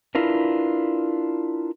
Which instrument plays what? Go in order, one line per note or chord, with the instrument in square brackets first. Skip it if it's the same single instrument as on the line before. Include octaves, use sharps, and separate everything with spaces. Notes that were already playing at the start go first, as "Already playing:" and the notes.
[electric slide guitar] D4 E4 F4 A#4 B4